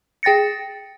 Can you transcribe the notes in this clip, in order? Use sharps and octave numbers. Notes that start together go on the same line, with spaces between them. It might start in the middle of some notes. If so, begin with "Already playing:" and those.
G#4 G5 A6 A#6 C#7